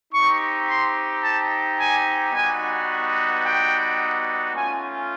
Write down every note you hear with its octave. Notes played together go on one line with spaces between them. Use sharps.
C4 D#4 G4 C#6
C6
A5
G#5
G3 B3 D#4 F#4 G#5
G5
A3 C#4 F4 G#5